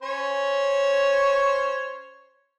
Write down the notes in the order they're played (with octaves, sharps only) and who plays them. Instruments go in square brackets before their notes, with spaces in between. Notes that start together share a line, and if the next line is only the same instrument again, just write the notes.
[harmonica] C#4 C5 C#5